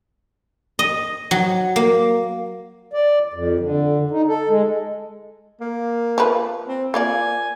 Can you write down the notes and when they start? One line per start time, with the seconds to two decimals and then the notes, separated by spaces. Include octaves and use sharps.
0.79 D#5
1.31 F#3
1.76 A#3
2.93 D5
3.34 F2
3.60 D3
4.11 D#4
4.28 A4
4.49 G#3
5.61 A#3
6.18 F3 B4
6.68 C4
6.94 A#3 F4 D5 G#5